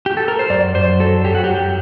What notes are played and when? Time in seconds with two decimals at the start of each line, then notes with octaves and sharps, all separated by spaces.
0.06 G4
0.17 A4
0.28 A#4
0.39 C5
0.50 F#2 D5
0.75 F#2 C5
1.00 F#3 A4
1.25 F#3 G4
1.35 F#4
1.44 G4
1.50 F#2